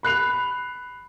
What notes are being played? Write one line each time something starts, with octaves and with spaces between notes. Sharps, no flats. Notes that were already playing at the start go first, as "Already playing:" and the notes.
B5 F#6 C7 F7